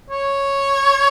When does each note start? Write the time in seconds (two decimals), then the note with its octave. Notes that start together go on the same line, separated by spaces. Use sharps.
0.10 C#5